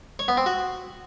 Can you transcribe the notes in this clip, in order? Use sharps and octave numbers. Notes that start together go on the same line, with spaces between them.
C#5
B3
C4
F#4